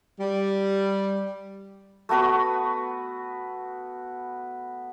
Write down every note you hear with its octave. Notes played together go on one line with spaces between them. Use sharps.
G3
A3 B3 F#4 B4